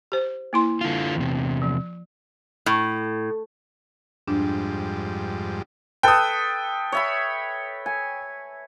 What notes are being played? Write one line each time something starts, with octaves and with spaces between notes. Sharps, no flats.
G4 C5
A#3 E4 C6
D3 F4
E2 C3
F3
A2
F2 G#2 G3 D4
A4 B4 G5 D#6
C#5 E5 B5
G#5